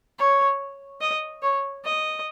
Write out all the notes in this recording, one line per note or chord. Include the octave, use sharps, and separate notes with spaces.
C#5
D#5
C#5
D#5